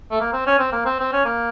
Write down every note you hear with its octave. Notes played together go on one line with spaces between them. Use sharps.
A3
A#3
C4
C#4
C4
A#3
C4
C4
C#4
A#3